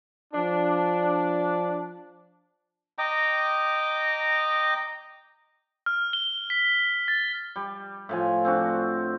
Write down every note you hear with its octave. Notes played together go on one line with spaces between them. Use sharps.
F3 D4
D#5 G5 A#5 D6
F6
G7
B6
A6
G3
A2 F3 G#5
C4 D4 F#4